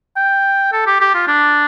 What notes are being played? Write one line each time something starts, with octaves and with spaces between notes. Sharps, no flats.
G5
A4
G4
G4
F4
D4